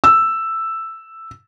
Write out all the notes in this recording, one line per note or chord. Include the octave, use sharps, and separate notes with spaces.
E6